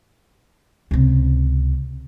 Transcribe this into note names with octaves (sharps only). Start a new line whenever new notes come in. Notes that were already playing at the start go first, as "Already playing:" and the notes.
C#2 C3